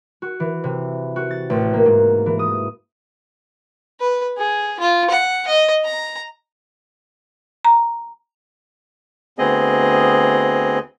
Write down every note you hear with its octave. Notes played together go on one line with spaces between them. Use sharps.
F#4
E3
C3
F#4
A6
A1
A#3
G#2
E3
D#6
B4
G#4
F4
F#5
D#5
A#5
A#5
D2 B3 C4 G#4 D#5